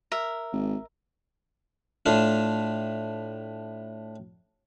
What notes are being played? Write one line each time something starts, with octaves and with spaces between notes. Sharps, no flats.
A#4 E5
G#1
A2 D4 F4